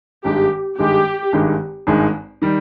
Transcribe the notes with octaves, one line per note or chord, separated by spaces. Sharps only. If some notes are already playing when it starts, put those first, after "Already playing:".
G#1 G2 D#3 G#3 G4
G#1 G2 D#3 G#3 G4
G#1 G2 D#3 G#3
G#1 G2 D#3 G#3
D#3 G3